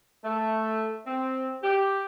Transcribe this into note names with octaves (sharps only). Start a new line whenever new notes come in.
A3
C4
G4